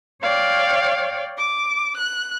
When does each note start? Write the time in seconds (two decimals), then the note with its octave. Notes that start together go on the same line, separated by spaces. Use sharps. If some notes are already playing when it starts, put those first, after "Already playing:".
0.21 C#5 D5 F5 G5
1.37 D6
1.97 F#6